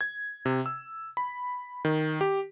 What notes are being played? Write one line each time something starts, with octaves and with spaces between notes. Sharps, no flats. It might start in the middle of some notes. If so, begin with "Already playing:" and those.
G#6
C3
E6
B5
D#3
G4